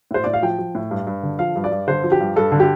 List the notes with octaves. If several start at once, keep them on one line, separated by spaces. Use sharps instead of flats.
A2 C5
A2 D5
F5
F3 G5
F3
A2
G2
G2
D3
F3 F5
G2
D5
G2
D3 C5
F3
G4
G2
G2 A4
D3
G4